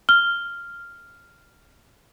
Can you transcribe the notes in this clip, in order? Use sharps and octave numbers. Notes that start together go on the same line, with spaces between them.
F6 G7